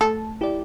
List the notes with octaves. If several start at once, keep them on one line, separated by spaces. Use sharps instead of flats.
A3 A4
E4 G4 D5